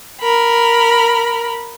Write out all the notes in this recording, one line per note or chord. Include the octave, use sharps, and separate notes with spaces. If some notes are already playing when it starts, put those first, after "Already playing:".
A#4 B5